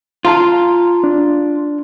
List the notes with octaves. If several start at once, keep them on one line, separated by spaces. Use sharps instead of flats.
F4 A5 A#5 C6
D4